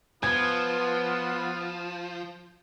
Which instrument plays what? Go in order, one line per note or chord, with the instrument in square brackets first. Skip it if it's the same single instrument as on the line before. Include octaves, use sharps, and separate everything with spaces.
[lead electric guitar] F3 [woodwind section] B3 [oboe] F4 [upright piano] G#6